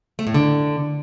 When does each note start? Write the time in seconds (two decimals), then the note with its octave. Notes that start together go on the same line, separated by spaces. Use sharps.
0.19 A3
0.27 A2
0.34 D3